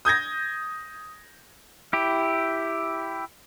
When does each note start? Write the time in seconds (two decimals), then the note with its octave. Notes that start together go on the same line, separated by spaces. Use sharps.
0.05 D#6 G6 G#6 A#6
1.93 E4 G4